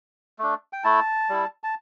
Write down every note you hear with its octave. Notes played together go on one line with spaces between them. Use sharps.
A3 D4
G5
A3 E4 A5
G3 E4
A5